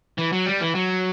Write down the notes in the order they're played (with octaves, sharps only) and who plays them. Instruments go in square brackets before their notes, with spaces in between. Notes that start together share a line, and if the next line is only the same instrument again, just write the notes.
[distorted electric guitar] E3
F#3
G3
E3
F#3